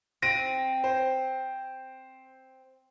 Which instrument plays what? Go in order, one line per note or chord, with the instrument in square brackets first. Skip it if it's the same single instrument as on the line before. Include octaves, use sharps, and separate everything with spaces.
[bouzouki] C4 [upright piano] A#6 D7 D#7
[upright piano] C5